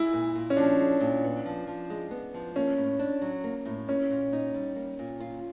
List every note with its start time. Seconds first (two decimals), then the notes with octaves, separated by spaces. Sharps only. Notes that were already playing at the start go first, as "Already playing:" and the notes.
Already playing: G#3 E4
0.13 A#2
0.35 A#2
0.50 C#4
0.57 F3 D4
0.79 G#3
1.00 A#2
1.24 B3
1.45 F3
1.67 F3
1.90 G#3
2.11 B3
2.34 F3
2.56 A#3 C#4
2.77 A2
2.99 D4
3.22 F#3
3.44 A#3
3.65 A2
3.88 A#3 C#4
4.10 A#2
4.33 D#4
4.54 G3
4.76 A#3
4.99 A#2
5.20 F4